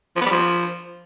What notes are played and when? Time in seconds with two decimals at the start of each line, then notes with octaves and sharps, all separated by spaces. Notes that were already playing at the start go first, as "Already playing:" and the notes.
0.16 F3
0.21 B3
0.26 G3
0.31 F3